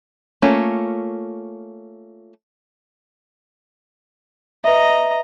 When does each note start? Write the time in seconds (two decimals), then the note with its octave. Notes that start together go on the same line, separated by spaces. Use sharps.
0.42 A3 A#3 C#4 F4
4.64 B4 D#5 E5 A#5